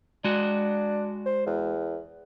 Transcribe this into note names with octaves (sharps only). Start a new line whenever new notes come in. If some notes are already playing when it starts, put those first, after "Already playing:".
G#3 D4 F#4
C5
E2